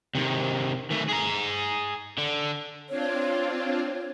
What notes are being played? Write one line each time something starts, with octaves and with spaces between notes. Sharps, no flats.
C3 D#3
D#3 A3
G#4 A#5
D3
C4 D4 F4 C#5